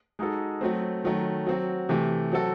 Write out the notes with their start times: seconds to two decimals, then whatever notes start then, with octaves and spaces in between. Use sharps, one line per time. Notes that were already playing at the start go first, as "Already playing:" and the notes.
0.19 G#3 D#4 F#4 A4
0.61 F#3 A3 C4
1.04 D#3 F#3 A3
1.47 F#3 C4 F#4
1.89 C3 E3 A3
2.32 F#3 C4 F#4 A4